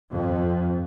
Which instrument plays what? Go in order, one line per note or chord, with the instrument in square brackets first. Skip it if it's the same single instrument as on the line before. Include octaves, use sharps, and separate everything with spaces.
[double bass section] F2